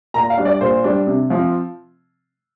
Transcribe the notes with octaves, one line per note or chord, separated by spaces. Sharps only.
A#2 A#5
F5
G3 D4
D5
A#2 C5
G3 D4
C3
F3 C4